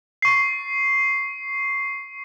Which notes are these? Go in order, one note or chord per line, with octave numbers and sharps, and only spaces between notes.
C#6 C7